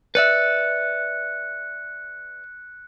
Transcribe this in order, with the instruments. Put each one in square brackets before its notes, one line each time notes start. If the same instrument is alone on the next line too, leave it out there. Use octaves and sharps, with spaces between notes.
[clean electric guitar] B4 D5 E5 [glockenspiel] F#6 C#7